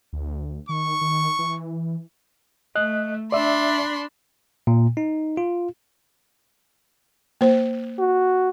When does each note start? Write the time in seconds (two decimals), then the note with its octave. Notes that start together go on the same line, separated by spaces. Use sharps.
0.13 D2
0.69 D#3 C#6
1.01 D#3
1.39 E3
2.75 A3 D#5 F#6
3.32 D4 D5 E5 B5 C6
4.67 A#2
4.97 D#4
5.37 F4
7.41 A#3 C5
7.99 F#4